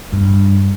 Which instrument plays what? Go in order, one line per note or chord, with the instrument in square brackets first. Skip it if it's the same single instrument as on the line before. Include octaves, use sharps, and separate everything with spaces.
[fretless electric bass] G2